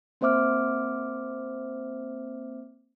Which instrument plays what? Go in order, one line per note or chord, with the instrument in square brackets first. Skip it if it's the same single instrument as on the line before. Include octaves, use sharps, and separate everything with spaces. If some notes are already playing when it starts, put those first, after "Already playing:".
[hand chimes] A#3 C4 C5 E5 D6 F6